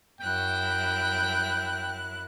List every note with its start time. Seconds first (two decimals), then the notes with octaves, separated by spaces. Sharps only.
0.21 F#2 E4 G5 F#6